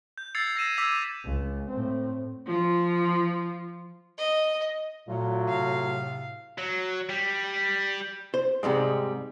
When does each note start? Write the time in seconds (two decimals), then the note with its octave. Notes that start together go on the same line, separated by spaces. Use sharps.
0.18 G6
0.35 E6 G#6 A6 C7 C#7 F7
0.56 E6 A#6 C7 D#7 E7
0.77 D6 E6 G#6 B6 D#7 F7
1.24 C#2
1.69 A2 C4
2.46 F3 F4
4.18 D#5
5.08 A#2 F#3 A3 F4
5.47 A2 C3 F5
6.58 F#3
7.09 G3
8.34 C5
8.63 G#2 C3 G3 G#3